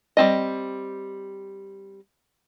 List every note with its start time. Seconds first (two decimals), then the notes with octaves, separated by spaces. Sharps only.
0.17 G3 C4 D#5